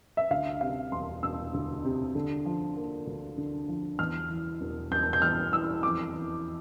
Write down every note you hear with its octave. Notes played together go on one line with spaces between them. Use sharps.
E5
D2 F5
C3 F5
E1 C6
E1 E6
D2
C3
D3
F3
A#3
D2
D3
F3
E2 F6
E3
E1
E1 G6
G6
E2 F6
E3 E6
F2 D6
E3